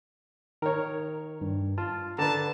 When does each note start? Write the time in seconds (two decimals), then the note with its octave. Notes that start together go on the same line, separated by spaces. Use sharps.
0.62 D#3 A#4 C#5
1.41 G2
1.78 F4 A5
2.18 D3 B4 A5 A#5